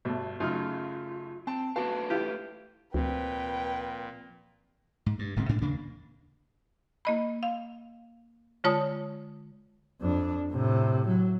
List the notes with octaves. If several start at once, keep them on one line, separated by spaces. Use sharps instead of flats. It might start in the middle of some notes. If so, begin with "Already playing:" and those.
G1 B2 A3
F#2 C#3 A3 D#4 F4 F6
C4 A5
A3 B3 F#4 B4 F5 A5
E4 F4 G4
D2 A#2 F3 C4 B4 G5
G#2
G2
D1 G#2 C#3 C4
G#2 D4
D#2 C#3 A#3 D4
A#3 D#5 B5
F5
D3 G#3 F4 C#5 A5 D#6
F2 D4
A2 C3
F#3